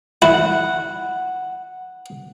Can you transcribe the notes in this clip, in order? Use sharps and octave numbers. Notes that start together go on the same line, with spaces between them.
E4 F#5